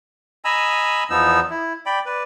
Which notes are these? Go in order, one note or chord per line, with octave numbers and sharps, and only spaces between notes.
D#5 G#5 A#5 B5 E6
E2 F3 B3 D#4 E6
E4
D5 G5 B5
B4 D5